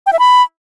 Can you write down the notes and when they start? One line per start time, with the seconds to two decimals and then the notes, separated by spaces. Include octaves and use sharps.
0.06 G5
0.13 E5
0.19 B5